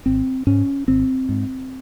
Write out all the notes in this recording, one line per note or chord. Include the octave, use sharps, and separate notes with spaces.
G#1 C4
G#2 C#4
G#1 C4
G#2